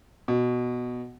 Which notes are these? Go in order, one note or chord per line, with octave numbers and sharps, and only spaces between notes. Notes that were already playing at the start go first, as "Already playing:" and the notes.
B2